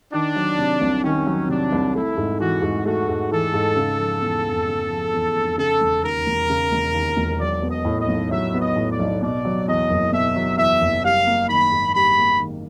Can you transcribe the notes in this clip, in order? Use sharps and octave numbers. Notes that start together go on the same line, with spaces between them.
D#3 D4
F#3
C3
C2
D#3 C#4
F#3
C3 D4
C2
A3 E4
G#2
E3 F#4
G#2
A3 F#4
G#2
E3 A4
G#2
C#3
F3
E2
F1
C#3
F3
E2
F1
C#3 A4
E1
D#2 A#4
E1
C#3
E1
D#2
E1
F#3 D5
B3
D#5
A2
D#5
B1
F#3 E5
B3
D#5
A2
D5
B1
B2 D5
F#3
E2 D#5
F#1
B2 E5
F#3
E2 E5
F#1
G3 F5
A#3
D#3 B5
G#2
G3 B5
A#3
D#3